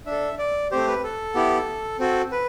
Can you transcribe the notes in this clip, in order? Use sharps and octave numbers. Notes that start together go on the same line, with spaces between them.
D4 E5
A4
D5
A3 C4 G4 C5
B4
A4
B3 E4 G4
C4 F#4 A4
B4